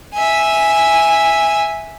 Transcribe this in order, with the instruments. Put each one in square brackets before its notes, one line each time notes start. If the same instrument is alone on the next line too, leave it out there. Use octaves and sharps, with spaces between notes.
[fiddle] E5 G#5